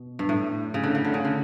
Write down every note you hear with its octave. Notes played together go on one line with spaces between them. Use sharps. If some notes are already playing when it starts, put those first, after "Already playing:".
Already playing: B2
G2
A2
C#3
D3
C#3
D3
C#3
D3